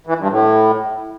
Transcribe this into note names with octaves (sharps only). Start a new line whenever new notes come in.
E3
G2
A2